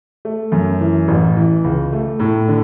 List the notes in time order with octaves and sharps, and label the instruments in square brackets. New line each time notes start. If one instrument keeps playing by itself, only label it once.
[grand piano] A3
F#2
E3
A1
E3
C#2
A3
A2
D3